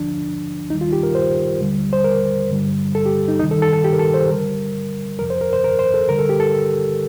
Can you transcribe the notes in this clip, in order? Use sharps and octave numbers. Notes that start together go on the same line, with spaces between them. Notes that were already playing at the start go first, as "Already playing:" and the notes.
Already playing: D#2 D3 F3 D4
D#2 D#3 G3 D#4
F4
G4
A#4
C5
D#2 D3 G3
C5
A#4
G2 D3 G3
A4
G4
D#4
D2 C3 D#3 G3 D#4
A4
A4
A4
G4
A#4
A4
C5
D2 D3 G3 A#4
F2 C3 F3 A#4
C5
A#4
C5
A#4
C5
A4
D2 D3 G3 A#4
A4
G4
A4